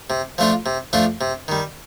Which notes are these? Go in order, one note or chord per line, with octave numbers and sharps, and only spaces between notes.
C3
F3 A3 D4 F4
C3
F3 A3 D4 F4
C3
D#3 G3